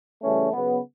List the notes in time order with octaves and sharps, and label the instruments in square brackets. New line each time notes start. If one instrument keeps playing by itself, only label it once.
[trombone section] C#3 E3 G3 A3 C#4
C#3 F#3 B3